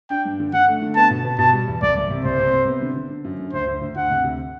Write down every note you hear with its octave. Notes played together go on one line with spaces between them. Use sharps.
D4 G5
G2
D3
D3 F#5
A3
D3
B3 A5
B2
B3
B2 A5
G3
E2
C2 D5
C2
C3
C2 C5
C3
C3
B3
D3
D3
D3
F#2
D3
D2 C5
D2
D2
D2 F#5
C3
D2